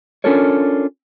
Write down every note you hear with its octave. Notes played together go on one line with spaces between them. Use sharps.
C#4 D4 F4 A4 A#4 C#5